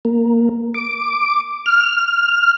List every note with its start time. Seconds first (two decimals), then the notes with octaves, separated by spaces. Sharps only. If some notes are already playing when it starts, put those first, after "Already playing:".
0.05 A#3
0.74 D6
1.66 F6